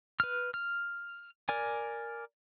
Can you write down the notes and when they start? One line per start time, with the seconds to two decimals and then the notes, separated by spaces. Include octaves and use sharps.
0.20 B4 F6
0.54 F6
1.49 A#4 D5 G#5